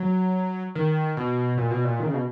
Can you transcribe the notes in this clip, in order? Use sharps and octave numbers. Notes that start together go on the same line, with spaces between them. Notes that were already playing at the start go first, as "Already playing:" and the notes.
Already playing: F#3
D#3
B2
A#2
B2
A#2
D#3
C#3
B2